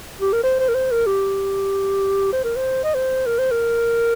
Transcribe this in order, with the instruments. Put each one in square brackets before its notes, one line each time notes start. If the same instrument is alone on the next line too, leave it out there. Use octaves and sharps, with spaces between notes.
[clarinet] G4
A#4
C5
C5
A#4
C5
A#4
G4
C5
A#4
C5
D#5
C5
A#4
C5
A#4